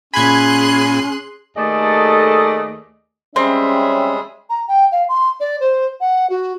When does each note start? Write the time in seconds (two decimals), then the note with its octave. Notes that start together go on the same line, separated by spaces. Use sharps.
0.14 A#2 C#4 G#4 G#5 B5 C6 F#6 G#6
1.57 D#2 A3 G#4 A4 D5 D#5
3.36 G3 G#3 C4 C#4 G#4 E5
4.50 A#5
4.68 G5
4.92 F5
5.09 C6
5.40 D5
5.60 C5
6.00 F#5
6.30 F#4